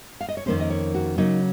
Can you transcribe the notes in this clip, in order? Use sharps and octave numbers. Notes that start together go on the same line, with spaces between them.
F5
D#5
C#5
F2 D#3 A#3 C#4 C5
D#5
C#5
F#4
C#3 F#3 A#3 D#4